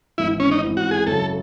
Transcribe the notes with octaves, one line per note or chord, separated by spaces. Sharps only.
G#1 G#2 E3 E4
C#4
D#4
A1 G#2 E3 C4 E4
F#4
G#4
F#2 C#3 F#3 A4